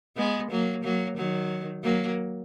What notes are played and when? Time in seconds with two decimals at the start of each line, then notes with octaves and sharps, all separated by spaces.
0.17 G#3 B3
0.51 F#3 A#3
0.83 F#3 A#3
1.17 D#3 F#3
1.84 F#3 A#3